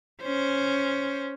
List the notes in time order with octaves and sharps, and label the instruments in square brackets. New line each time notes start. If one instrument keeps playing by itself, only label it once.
[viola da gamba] C#4 C5